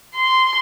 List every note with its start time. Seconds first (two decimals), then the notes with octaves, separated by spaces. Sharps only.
0.16 C6